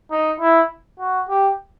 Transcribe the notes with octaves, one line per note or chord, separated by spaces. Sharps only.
D#4
E4
F#4
G4